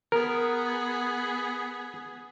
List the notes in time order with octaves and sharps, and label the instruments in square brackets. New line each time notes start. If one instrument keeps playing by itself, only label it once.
[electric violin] B3 G#4 [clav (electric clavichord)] A#4